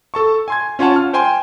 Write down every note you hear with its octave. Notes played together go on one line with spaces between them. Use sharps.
A4 A5 C#6
G#5 C6 G#6
C#4 F4 C#5 F#5 A5
F6
C5 G5 G#5 C6